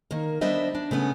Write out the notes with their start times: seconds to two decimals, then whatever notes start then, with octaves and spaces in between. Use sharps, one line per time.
0.11 D#3 A#3
0.41 G3 B3 D4 C5 D#5 E5
0.75 D4
0.91 C#3 A3 B3 C#4